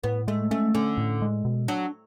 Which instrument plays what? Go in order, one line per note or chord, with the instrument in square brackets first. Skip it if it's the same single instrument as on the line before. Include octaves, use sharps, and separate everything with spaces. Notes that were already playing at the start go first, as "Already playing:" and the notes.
[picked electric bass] A2 [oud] B3
[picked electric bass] G#3 [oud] A3
[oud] A3 [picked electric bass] C#4
[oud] D3 [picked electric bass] C#4
[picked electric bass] A2
G#3
B2
[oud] F#3 [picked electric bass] D4